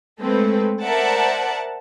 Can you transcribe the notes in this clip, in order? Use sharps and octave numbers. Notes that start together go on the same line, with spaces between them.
G#3 A3 C4 A4 B4
A#4 C5 D5 E5 F#5 A5